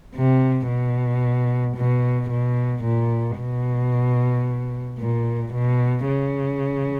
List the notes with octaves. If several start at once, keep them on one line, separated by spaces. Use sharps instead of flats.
C3
B2
B2
B2
A#2
B2
A#2
B2
C#3